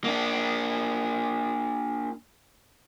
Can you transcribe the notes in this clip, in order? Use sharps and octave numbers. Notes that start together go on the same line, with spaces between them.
A#3 D4